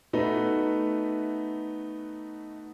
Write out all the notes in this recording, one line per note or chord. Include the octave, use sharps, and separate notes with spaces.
A3 B3 D#4 F#4 B4